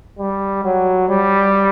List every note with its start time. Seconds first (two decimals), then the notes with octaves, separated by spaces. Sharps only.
0.19 G3
0.64 F#3
1.09 G3